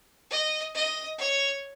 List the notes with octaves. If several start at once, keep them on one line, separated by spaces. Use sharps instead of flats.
D#5
D#5
C#5